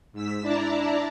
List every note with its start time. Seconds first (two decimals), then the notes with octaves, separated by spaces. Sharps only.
0.13 G#2 E6 B6
0.42 D4 E4 D5 A5 A#5